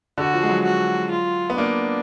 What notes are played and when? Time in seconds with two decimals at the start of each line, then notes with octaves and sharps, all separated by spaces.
0.18 D3 F#4
0.34 F3
0.43 G#3
0.49 F#3
0.65 F#4
1.11 F4
1.50 B3
1.57 A#3 D4